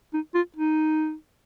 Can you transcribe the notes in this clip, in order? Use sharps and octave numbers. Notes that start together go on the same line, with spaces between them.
D#4
F4
D#4